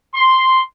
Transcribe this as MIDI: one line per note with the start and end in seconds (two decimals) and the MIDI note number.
0.15 0.61 84